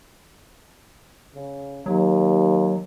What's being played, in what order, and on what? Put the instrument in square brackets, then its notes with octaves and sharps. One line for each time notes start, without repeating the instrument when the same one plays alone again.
[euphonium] C#3
[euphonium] D#2 [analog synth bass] F#3